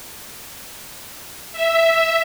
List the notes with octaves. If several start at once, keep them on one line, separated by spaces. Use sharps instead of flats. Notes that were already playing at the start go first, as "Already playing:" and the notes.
E5